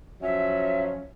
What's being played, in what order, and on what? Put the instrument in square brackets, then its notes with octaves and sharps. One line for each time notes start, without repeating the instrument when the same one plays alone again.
[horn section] F3 F#3 C#4 [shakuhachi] E5